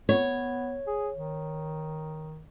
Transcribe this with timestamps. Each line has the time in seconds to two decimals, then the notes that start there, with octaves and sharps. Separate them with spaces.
0.09 B3 C#5
0.87 G#4
1.15 D#3